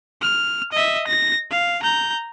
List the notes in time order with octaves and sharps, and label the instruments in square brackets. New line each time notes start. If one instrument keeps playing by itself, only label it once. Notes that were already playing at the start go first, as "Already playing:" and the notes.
[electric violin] F6
D#5 E5
A#6
F5
A#5 G6